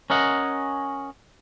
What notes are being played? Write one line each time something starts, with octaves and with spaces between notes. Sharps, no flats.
C#4 A#4 D#5 F#5